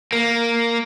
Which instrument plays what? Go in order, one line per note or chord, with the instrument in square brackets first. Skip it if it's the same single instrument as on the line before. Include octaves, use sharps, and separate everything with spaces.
[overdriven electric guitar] A#3